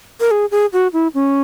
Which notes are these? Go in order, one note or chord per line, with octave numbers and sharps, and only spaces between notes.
A#4
G#4
G#4
F#4
E4
C#4